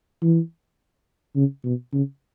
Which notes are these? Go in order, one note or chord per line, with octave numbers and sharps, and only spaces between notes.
E3
C#3
B2
C#3